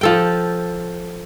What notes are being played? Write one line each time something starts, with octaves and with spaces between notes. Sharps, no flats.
F3 A4 G5